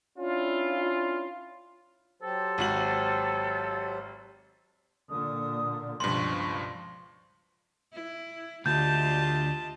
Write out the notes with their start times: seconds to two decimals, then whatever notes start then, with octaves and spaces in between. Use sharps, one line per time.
0.19 C#4 D4 E4 F4
2.22 F#3 G4 A4 C5
2.58 G#1 F#4 F#7
5.10 A#2 D3 D#6
6.00 C#2 G2 B2 F3 C6 C#6
7.93 E4
8.66 D2 F4 G4 D#5 A5 G6